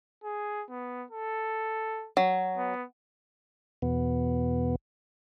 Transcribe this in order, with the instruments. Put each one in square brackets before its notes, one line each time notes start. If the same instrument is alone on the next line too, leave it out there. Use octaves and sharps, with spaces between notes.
[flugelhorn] G#4
B3
A4
[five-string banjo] F#3
[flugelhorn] B3
[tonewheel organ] E2 B2 B3